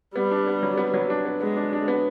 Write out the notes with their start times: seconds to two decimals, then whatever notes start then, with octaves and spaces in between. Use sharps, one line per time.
0.16 G3 B3
0.31 D4
0.47 B3
0.63 F#3
0.78 B3
0.94 F#3
1.10 D4
1.25 B3
1.41 G#3 B3
1.57 D4
1.73 D4
1.88 B3